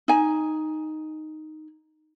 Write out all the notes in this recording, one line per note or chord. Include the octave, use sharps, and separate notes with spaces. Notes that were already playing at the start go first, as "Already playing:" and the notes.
D#4 G#5